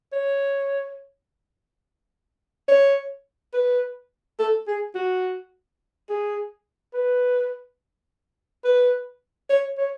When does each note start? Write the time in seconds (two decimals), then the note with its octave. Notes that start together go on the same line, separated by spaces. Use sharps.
0.12 C#5
2.68 C#5
3.54 B4
4.39 A4
4.67 G#4
4.95 F#4
6.10 G#4
6.94 B4
8.65 B4
9.50 C#5
9.78 C#5